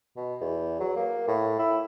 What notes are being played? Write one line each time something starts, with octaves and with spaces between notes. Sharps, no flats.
B2
E2
F#3
A#3
A2
E4